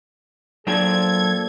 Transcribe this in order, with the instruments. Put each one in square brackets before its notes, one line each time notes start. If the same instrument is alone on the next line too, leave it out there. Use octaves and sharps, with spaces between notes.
[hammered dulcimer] A#2 C5 [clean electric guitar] F#3 D4 G5 [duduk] A4 [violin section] G#6